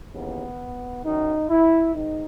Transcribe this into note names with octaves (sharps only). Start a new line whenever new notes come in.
D#2 C#3 E3 B3
F#2 D#3 D#4
E4
G#2 D#3 D#4